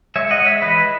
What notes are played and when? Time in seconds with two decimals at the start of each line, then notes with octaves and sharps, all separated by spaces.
0.16 G#3 C#5 E5
0.31 D#5 F#5
0.39 G#3
0.46 C#5 E5
0.62 E3 B4 D#5